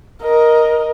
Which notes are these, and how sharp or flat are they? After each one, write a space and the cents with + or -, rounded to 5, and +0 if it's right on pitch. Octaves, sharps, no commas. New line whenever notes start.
A#4 +10 D#5 +0